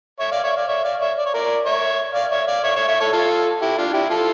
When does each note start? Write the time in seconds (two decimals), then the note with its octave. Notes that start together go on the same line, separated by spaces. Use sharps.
0.20 C#5 E5
0.32 D5 F5
0.43 C#5 E5
0.56 D5 F5
0.68 C#5 E5
0.84 D5 F5
1.01 C#5 E5
1.18 D5
1.26 C#5
1.34 A#4 D5
1.65 C#5 E5
2.14 D5 F5
2.31 C#5 E5
2.47 D5 F5
2.64 C#5 E5
2.76 C#5 E5
2.88 C#5 E5
3.00 A4 C#5
3.13 F4 A4
3.62 E4 G4
3.78 D4 F4
3.94 E4 G4
4.10 F4 A4